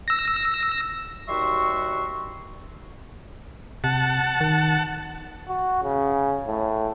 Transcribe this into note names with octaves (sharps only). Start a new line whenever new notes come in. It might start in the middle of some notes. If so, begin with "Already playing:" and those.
E6 A#6
D#2 G3 F#4 E5 C6 C#6
C3 F#5 A5
D#3
F#4
C#3
A2